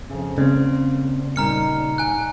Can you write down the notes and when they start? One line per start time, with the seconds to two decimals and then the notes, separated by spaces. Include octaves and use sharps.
0.10 F2 C#3
0.38 C#3 A#3 C4 D5
1.36 A#2 G3 D#4 A#5 F6 C#7
1.98 G#5 F#6